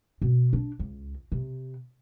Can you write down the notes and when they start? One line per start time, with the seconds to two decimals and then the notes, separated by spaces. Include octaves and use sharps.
0.22 B2
0.53 D4
0.79 C#2
1.32 C3